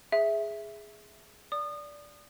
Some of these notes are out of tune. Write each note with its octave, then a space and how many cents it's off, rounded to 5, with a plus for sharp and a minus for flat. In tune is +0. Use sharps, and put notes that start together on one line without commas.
G#4 +0 E5 +0
D5 -10 D#6 -30